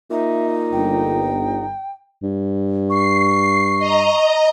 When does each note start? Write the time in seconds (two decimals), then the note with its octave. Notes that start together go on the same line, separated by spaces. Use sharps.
0.11 A#2 D#4 E5
0.72 G1 G5
2.22 G2
2.90 C#6 C7
3.79 D#5 A#5